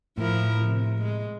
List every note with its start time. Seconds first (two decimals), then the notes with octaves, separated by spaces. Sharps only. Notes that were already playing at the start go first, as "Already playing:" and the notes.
0.18 A2 F3 E4 A#4
0.65 C3
1.01 G#3